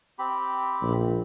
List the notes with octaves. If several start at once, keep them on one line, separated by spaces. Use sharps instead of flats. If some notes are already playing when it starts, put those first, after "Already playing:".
C4 G4 B5
A#1